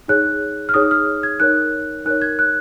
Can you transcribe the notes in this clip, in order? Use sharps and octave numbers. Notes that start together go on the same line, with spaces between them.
D#4 G#4 C#5 F#6
F6
D#4 G#4 C#5 D#6
F6
G#6
D#4 A#4 C#5 F#6
D#4 A#4 C#5 F#6
G#6
F#6